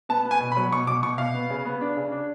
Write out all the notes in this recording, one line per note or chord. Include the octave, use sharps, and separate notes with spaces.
B3 A5
B3
G#5
B2
B5
F#3
B2 C#6
B2 D6
B2 C#6
B2 F5
B3
C#3
B3
D4
C#3
D4